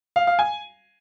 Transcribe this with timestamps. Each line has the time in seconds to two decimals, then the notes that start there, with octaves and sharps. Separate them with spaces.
0.16 F5
0.27 F5
0.39 G#5